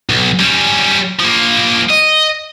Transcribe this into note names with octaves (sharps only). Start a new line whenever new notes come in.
B1
G3 C#4
F3 A#3
D#5